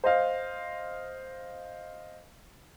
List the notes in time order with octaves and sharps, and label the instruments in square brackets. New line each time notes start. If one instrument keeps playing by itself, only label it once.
[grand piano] C5 D#5 F5